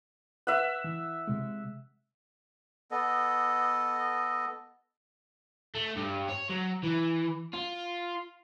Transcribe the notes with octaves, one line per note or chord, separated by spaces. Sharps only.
B4 E5 F#5
E3
C3 G#3
B3 A4 D#5
A3
G2
C#5
F#3
E3
F4